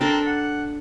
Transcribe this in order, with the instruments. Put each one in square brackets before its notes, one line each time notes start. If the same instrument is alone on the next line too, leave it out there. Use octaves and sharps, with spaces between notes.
[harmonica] C4 A#4 [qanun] D4 A4
[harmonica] F#5